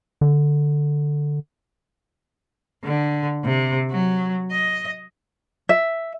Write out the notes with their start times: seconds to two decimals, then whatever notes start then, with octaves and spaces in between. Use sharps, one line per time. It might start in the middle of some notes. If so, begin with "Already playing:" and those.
0.21 D3
2.84 D3
3.44 C3
3.91 F#3
4.51 D#5
5.69 E5